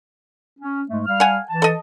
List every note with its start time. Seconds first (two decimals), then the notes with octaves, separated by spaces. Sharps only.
0.60 C#4
0.90 G#2 G#3 A3
1.06 G3 F5 F6
1.20 F#5 G#5
1.49 E3 A5
1.62 A4 D#5